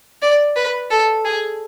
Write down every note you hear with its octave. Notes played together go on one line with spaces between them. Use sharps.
D5
B4
A4
G#4